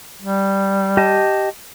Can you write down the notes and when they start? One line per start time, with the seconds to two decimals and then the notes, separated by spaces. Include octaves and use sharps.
0.22 G3
0.97 G4 D#5 A5